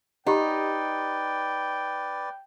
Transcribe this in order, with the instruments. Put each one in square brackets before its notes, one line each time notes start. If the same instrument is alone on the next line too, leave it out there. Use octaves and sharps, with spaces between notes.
[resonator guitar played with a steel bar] D#4 [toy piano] G4 F#5 [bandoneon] B4 D5 [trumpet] G5